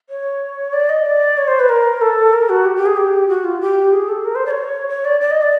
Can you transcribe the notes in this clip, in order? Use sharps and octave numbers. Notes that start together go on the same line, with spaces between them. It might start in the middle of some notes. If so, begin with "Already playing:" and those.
C#5
D5
D#5
D5
C#5
C5
B4
A#4
A4
A#4
F#4
G4
G4
G#4
G4
F#4
F4
G4
G#4
A4
A#4
C5
D5
C#5
C#5
D5
D5
D#5
D5